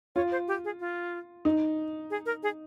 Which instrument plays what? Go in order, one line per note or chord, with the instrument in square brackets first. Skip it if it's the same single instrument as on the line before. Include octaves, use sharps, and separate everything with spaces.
[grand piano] F4 [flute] C#5
[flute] C5
G4
G#4
F4
[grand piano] D#4
[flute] G#4
A#4
G#4